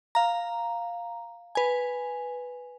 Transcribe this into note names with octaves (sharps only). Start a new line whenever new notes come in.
F5 A#5
B4 G#5